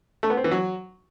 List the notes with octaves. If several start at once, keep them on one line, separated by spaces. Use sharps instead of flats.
A3
B3
C4
E3
F#3